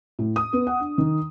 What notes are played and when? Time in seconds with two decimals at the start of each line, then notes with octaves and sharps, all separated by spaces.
0.19 A2
0.36 D#6
0.53 B3
0.67 F#5
0.80 D4
0.98 D#3